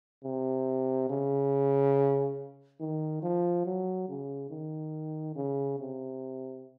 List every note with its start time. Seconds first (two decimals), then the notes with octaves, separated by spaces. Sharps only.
0.24 C3
1.09 C#3
2.80 D#3
3.23 F3
3.65 F#3
4.08 C#3
4.50 D#3
5.35 C#3
5.79 C3